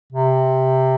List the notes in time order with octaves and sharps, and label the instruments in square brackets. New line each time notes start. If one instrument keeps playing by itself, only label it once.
[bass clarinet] C3